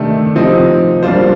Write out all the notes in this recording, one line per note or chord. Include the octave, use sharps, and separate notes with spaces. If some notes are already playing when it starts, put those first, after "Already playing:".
Already playing: C3 D#3 A3 D4
C3 F3 C4 D#4
G3 A#3 D4 F4 C5